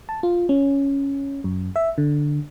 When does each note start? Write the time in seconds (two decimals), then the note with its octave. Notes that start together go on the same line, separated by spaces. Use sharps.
0.09 A5
0.23 F4
0.49 C#4
1.44 F#2
1.76 E5
1.98 D3